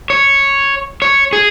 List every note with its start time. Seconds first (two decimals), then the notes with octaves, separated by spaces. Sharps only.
0.10 C#5
1.02 C#5
1.33 G#4